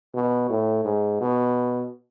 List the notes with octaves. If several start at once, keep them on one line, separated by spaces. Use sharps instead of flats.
B2
A2
G#2
B2